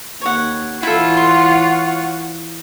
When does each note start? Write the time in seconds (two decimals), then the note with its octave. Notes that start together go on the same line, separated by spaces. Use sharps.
0.21 D#2 C#5 F#5
0.83 E3 E4 F4 A4 C#5 F#5
1.17 C6